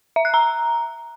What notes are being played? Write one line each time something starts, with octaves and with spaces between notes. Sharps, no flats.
E5
F#6
A#5